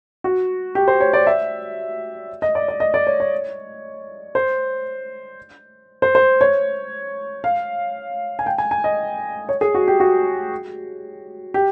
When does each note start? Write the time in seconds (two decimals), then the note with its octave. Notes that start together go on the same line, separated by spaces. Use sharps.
0.24 F#4
0.75 G4
0.88 C5
1.01 C#5
1.13 D5
1.27 E5
2.42 D#5
2.55 D5
2.68 D5
2.80 D#5
2.94 D5
3.07 C#5
3.20 C#5
4.35 C5
6.02 C5
6.15 C5
6.41 C#5
7.44 F5
8.39 G#5
8.46 G5
8.58 G#5
8.71 G#5
8.84 D#5
9.49 C#5
9.61 G#4
9.74 F#4
9.88 G4
10.00 F#4
11.54 G4